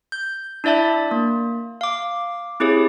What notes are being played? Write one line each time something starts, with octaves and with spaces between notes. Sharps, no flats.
G6
D4 E4 D5 E5 A5
A#3
F5 D6
C4 E4 G4 G#4 C#5